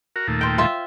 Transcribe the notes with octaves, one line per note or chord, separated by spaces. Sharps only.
F#4 A#4
D#2 A#2 A3
C5 G5
F4 E5